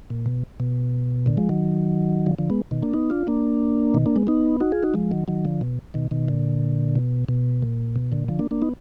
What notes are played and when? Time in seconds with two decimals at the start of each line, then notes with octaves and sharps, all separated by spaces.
0.10 A#2
0.26 B2
0.60 B2
1.26 A#2 D3
1.37 F3 G#3
1.49 D#3 F#3
2.26 D3 F3
2.39 D3 F3
2.50 G#3 B3
2.71 B2 D#3
2.83 A#3 D4
2.94 B3 D#4
3.10 D4 F4
3.27 A#3 D4
3.94 B2 D#3
4.06 A#3 D4
4.16 G#3 B3
4.27 B3 D#4
4.60 D#4 F#4
4.72 F4 G#4
4.83 D#4 F#4
4.94 F3 G#3
5.11 D#3 F#3
5.28 D#3 F#3
5.45 D3 F3
5.61 B2
5.94 B2 D#3
6.11 B2 D#3
6.28 A#2 D3
6.95 B2
7.29 B2
7.62 A#2
7.96 B2
8.12 A#2 D3
8.28 D3 F3
8.39 A#3 D4
8.51 A#3 D4
8.62 B3 D#4